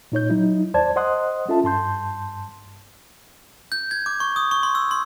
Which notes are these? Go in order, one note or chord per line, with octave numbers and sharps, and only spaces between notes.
A#2 D#4 C#5 G6
F#3 D#4 E4
D#2 C5 D5 A5 G#6
C5 D#5 F#5 C6 D#6 F#6
C#4 F4 A4 E5 A5
G2 A5 C6 G6
G6
G#6
D6
C#6
D#6
C#6
C6
E6
C6